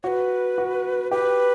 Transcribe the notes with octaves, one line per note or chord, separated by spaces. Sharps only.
F#4 B4 C#5
F#4
G4 B4